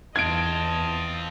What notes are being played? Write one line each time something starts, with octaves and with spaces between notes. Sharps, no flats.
E2 C4 F4 D#5 A5 G#6 D7